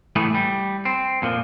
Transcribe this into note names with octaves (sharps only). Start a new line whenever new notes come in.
A2 E3 G3 A3 B3 G#4
G3
C4
F2 A#2 D#3 F3